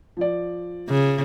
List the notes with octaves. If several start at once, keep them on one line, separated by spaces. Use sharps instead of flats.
F3 D5
C#3